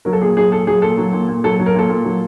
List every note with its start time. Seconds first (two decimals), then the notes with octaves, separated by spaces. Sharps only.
0.05 F#3 A#4
0.13 A4
0.21 A#2 G#4
0.37 F#3 G#4
0.52 A#2 A4
0.67 F#3 G#4
0.82 A#2 A4
0.98 F#3
1.13 A#2
1.28 A#2
1.44 F#3 A4
1.60 F#3
1.66 A#4
1.75 A#2 A4
1.89 A#2
2.05 F#3